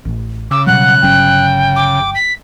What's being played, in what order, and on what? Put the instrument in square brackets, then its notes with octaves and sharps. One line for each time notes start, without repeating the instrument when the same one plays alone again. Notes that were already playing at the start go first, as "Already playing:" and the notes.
[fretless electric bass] A1
[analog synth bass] C#3 [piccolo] D6 [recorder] E6
[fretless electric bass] B2 F#3 G3 [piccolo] F#5 [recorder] F#6
[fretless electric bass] G1 F#3 C#4 [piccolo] G5
[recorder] D6
B6